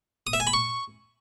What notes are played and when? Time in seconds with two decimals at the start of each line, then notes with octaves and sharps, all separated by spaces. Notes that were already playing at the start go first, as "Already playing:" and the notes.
0.27 D#6
0.33 E5
0.40 G#5
0.47 B5
0.53 C#6